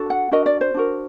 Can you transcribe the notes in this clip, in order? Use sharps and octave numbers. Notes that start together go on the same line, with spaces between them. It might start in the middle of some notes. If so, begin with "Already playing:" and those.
Already playing: D4 F#4 A4
F#5
D4 F#4 A#4 D#5
D5
C5
D4 F#4 A#4